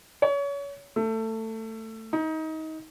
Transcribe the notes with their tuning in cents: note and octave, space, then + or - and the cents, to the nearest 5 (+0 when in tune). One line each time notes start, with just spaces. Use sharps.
C#5 +30
A3 +20
D#4 +25